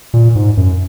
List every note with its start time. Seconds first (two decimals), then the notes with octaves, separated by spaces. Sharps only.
0.14 A#2
0.35 G#2
0.57 F#2